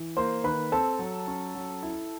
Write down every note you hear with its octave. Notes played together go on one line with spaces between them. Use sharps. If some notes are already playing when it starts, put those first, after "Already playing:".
Already playing: E3
A#3 C5 C6
D#3 B4 B5
C4 A4 A5
F#3
C#4
F#3
E4